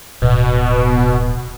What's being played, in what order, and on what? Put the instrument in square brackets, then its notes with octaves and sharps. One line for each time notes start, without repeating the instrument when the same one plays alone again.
[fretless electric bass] D1 [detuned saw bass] B2